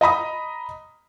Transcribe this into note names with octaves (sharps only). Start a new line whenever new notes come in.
D#5 A#5 B5 D#6